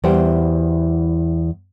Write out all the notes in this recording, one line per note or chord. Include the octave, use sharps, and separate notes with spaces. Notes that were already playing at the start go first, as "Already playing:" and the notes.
E2 G3 E4 C5 F#5 G5